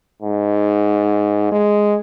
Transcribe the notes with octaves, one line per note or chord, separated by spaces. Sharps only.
G#2
G#3